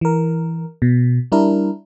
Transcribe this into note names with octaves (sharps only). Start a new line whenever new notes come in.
E3 A#4
B2
G3 D4 E4 A#4